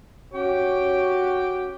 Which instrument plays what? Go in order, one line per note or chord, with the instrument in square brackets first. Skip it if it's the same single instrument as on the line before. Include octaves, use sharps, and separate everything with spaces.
[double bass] C#4 [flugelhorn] F#4 [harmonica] G5 D6